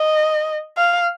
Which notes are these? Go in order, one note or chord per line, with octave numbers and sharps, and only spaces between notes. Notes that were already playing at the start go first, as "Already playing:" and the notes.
Already playing: D#5
F5